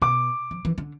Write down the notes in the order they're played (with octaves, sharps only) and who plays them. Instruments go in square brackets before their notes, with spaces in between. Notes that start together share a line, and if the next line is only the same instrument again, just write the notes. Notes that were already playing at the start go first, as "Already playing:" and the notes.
[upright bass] B2 [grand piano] D6
[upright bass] F3
E3
D3